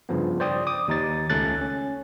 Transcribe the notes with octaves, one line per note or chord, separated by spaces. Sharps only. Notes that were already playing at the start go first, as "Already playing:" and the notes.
G2 C#3 F3 B3
C5 D5 G5 D#6
D6 D#6
D#2 D#4 A6
C#2 A3 C#4 A4 F#6 A6
C#4